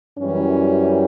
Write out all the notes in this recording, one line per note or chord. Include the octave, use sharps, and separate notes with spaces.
F#2 E3 G3 C#4